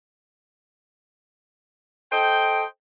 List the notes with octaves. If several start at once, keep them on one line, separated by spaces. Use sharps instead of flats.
A4 C5 D#5 G5